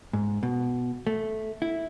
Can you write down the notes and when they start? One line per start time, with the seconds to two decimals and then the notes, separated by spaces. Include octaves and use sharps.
0.13 G#2
0.43 B2
1.07 A3
1.62 E4